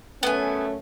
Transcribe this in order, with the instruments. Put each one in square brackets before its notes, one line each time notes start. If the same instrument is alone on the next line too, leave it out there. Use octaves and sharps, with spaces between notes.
[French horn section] F#2 A3 C#4 [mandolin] B3 G#5